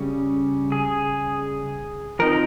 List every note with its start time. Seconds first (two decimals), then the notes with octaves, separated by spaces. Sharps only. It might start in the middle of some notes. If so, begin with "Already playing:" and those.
Already playing: C#3 G3 C#4
0.72 G#4
2.19 F3 C4 D#4 A#4